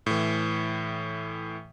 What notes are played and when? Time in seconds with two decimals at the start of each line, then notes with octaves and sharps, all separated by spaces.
0.06 A2 E3